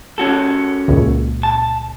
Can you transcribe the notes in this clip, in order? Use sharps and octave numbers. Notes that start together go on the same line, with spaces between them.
C#4 F#4 A4
C#2 A#2 C#3
A5